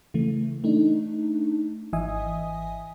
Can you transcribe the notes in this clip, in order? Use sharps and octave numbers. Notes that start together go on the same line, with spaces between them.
C#3 E3 A3
A3 D4 D#4
G#1 E3 D#5 E5 G#5 D#6